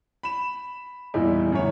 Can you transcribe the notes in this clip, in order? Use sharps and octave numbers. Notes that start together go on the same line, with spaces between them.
B5 E7
E2 A#2 G3 D#4 E4
F#2 A2 D3 C#5